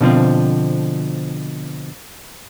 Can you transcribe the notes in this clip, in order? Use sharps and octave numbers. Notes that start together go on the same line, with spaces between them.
B2 D3 F3 C4